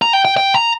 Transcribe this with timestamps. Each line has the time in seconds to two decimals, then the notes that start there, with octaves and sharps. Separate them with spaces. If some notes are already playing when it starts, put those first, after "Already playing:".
0.02 A#5
0.13 G5
0.25 G5
0.37 G5
0.54 A#5